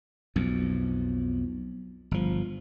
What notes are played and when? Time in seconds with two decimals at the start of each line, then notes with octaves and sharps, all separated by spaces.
0.36 B1 F2
2.11 G1 F3